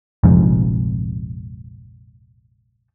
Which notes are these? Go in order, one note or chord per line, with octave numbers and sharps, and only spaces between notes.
F1 A#1 F2 G#2